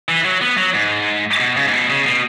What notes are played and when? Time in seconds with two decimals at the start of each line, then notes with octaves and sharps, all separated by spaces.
0.08 E3
0.25 F#3
0.42 B3
0.57 F#3
0.74 G#2
1.40 B2
1.57 C#3
1.67 G#2
1.73 B2
1.90 C#3
2.06 B2